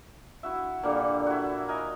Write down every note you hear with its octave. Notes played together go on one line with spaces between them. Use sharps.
E4 F#4 E5
A#2 D3 G3 A#3
E4 F#4
A#4 D#5 G#5